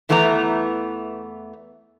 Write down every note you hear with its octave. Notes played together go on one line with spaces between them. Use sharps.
E2 E3 A3 B3 E4 A#5